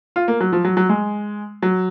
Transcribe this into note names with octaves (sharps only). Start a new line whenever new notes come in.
F4
A#3
F#3
F3
F#3
F#3
G#3
F#3